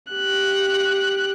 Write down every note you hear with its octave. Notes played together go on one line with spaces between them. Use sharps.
G4 F#6